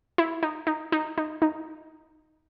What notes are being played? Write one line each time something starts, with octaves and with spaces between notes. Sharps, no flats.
E4
D#4
D#4
D#4
D#4
D#4